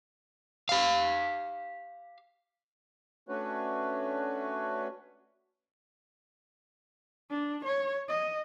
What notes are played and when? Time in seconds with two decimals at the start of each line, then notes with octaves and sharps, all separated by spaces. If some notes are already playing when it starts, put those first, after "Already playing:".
0.69 G4 F5
3.29 A3 C#4 D4 F#4 B4 C#5
7.30 D4
7.65 C#5
8.08 D#5